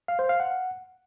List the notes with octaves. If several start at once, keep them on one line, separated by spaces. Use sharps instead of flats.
F5
C5
F5
F#5